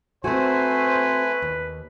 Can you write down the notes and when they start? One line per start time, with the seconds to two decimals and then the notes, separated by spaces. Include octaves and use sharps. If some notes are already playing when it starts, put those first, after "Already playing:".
0.24 A3 C4 F#4 B4 C5 G#5
1.42 D#2